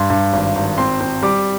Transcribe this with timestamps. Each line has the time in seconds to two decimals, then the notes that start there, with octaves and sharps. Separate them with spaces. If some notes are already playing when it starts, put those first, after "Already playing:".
Already playing: G2 C6
0.10 G2
0.33 G#1
0.55 G#1
0.78 C4 C6
1.01 C4
1.23 G3 D6